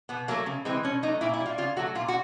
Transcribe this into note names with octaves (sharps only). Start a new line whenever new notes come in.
B2 B3
F#3 A3 A#3
C#3
E3 G#3 C4
B2 C#4
F#3 A3 D#4
A#2 E4
E4
G3
F4
C#3 F4
F#3 A3 F#4
A#2 F4
F#4